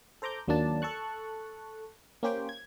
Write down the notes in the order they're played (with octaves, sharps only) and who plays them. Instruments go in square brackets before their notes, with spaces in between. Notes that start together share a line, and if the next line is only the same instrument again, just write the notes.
[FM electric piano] A4 C5 A#5 D6 G6
D#2 F#3 A#3 D4 A5
A4 A5 C#6 F#6
A#3 C#4 G4 C5 G5
G#6